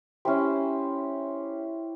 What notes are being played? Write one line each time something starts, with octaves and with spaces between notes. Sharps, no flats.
C#4 E4 G4 C5